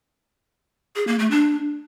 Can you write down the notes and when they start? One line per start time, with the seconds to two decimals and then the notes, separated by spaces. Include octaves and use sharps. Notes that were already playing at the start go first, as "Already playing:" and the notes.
0.96 G#4
1.07 A#3
1.19 A3
1.31 D4